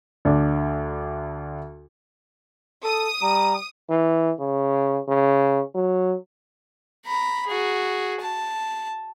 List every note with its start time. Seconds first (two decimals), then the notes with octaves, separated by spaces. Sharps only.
0.25 D2 D4
2.83 A4 D#6
3.22 G3 A#5
3.90 E3
4.40 C#3
5.09 C#3
5.75 F#3
7.06 A#5 B5
7.47 F#4 G#4
8.21 A5